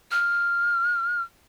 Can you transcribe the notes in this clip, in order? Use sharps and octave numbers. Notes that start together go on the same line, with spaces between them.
F6